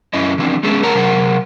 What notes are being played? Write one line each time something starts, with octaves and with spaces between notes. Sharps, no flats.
F#2 A3 C#4 E4 D#5
E3 F3 C4 D4
G#3 A3 B3 C#4 G#4 A4
A4 A#4 C#5 F#5 A5 A#5
C3 F#3 A#4 C5 F#5